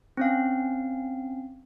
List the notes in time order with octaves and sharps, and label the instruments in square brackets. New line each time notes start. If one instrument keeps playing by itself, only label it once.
[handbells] C4 C#4 F5